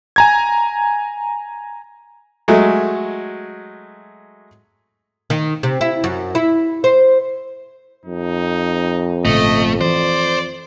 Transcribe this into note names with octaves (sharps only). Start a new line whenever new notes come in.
G#5 A#5 G#6
F#3 G#3 A3
D#3
C3
E4
F#2
E4
C5
F2 D#4
G#1 A#2 C#3 A3 D#5
E3 C5 D5